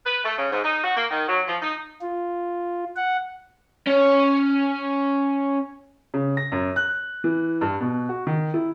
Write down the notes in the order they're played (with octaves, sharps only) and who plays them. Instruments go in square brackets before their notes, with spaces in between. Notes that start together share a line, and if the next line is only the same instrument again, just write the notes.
[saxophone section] B4
A3
C#3
G#2
D#4
F#4
A#3
D#3
F#3
F3
D#4
[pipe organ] F4
F#5
[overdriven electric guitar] C#4 C#5
[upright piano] C#3
A#6
F#2
F#6
E3
G2
B2
F#4
D#3
E4